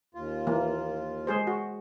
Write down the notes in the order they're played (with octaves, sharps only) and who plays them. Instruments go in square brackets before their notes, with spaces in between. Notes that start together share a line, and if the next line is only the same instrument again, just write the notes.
[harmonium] D#2 F4
[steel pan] E3 A#3
G#3 G#4 C5
F#4